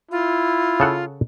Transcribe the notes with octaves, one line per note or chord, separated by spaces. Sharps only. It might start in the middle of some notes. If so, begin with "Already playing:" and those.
E4 F4
C#3 A4 F#5